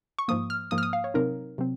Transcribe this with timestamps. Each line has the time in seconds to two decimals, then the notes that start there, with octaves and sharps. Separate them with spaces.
0.19 C#6
0.28 G#2 F3 A#3 D#6
0.50 F6
0.71 G#2 F3 A#3 D#6
0.78 F6
0.83 D#6
0.93 F5
1.04 C#5
1.14 C3 F#3 C4 D#4 A#4
1.58 C3 F#3 C4